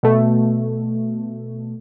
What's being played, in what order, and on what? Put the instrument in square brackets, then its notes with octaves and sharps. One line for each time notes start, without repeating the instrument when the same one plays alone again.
[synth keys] B2 A3